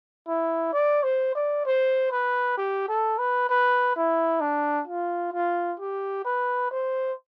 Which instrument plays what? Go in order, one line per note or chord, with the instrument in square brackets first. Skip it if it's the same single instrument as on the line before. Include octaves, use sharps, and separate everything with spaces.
[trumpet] E4
D5
C5
D5
C5
B4
G4
A4
B4
B4
E4
D4
F4
F4
G4
B4
C5